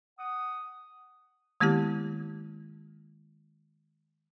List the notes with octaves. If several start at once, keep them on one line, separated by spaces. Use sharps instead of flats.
F#5 D#6
D#3 G#3 A#3 B3 E4 G4